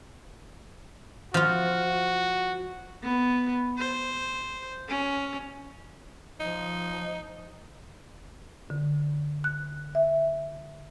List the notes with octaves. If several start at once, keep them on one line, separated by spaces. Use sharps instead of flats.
F3 F4 F#4
B3
C5
C#4
F3 D#4
D3
F#6
E5